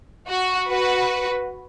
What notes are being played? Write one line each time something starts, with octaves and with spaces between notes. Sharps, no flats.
F#4
F#4 B4